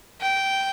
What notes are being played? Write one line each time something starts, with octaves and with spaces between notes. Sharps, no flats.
G5